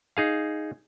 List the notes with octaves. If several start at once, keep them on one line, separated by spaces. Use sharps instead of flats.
D#4 G#4 F5